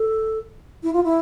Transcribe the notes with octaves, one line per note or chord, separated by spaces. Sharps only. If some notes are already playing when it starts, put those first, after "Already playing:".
Already playing: A4
E4
F4
E4